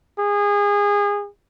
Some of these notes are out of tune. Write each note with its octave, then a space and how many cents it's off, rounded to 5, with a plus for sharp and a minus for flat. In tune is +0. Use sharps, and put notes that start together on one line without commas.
G#4 -25